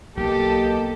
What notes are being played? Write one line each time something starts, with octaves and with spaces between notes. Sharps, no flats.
B1 A#3 G4 A4 D#5